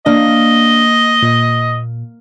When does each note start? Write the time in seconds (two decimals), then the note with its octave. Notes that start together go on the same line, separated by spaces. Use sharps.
0.06 A#3 D4 D#5
1.23 A#2